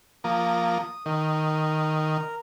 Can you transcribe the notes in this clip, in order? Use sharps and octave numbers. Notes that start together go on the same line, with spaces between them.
F3 A#3 D#6
D#3 A#4